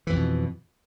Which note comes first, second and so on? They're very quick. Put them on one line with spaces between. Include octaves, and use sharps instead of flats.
E3 F2 G#2 B2